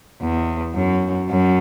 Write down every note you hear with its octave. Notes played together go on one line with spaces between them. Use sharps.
E2
F#2
F#2